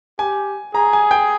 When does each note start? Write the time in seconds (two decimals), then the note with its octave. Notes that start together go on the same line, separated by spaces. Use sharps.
0.19 G4 G#5
0.74 G#4 A#5
0.93 G#5
1.11 G5